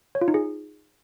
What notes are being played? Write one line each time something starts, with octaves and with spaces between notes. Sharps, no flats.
C#5
F4
D#4
G#4